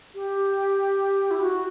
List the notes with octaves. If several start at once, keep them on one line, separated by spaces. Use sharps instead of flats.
G4
E4
F#4